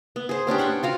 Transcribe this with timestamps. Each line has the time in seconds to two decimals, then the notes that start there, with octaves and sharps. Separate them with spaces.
0.16 B3
0.29 G#4 C5
0.47 B3 C#4 D4 G4
0.58 C5 F#5 G5 C#6
0.83 F4 F#4 F5